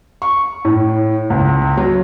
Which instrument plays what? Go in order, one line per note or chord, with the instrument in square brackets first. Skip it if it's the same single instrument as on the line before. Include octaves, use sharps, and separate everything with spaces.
[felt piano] C#6
A2
C#2
F#3